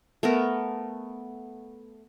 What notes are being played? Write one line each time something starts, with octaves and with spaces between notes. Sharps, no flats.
A3 B3 A#4